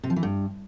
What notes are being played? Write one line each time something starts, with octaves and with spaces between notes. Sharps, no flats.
C3
F3
E3
G2